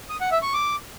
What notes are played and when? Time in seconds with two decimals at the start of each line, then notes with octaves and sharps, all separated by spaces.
0.10 D#6
0.21 F#5
0.31 E5
0.42 C#6
0.53 D6